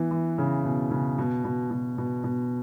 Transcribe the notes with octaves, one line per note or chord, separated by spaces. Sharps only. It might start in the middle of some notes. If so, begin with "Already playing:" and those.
Already playing: E3 B3
E3
C#3
B2
C#3
B2
B2
B2
B2
B2